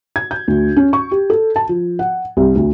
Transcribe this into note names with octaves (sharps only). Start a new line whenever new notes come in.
G#6
G6
D2
C#4
C#6
G4
A4
A5
F3
F#5
C2
D2